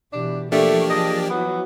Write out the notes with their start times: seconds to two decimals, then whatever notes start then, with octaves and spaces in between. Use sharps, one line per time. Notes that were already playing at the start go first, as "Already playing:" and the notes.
0.13 B2 E3 D4 G4
0.52 F3 A3 A#3 D4 G4 D5 C#6
0.90 G#4 D#5 A5
1.30 E3 F#3 B3